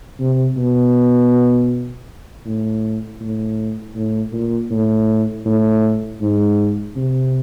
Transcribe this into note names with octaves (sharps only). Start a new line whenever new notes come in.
C3
B2
A2
A2
A2
A#2
A2
A2
G#2
C3